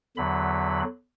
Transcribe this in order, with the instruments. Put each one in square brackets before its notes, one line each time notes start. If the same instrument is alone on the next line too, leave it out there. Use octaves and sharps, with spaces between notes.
[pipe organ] E2 D3 F#3 B5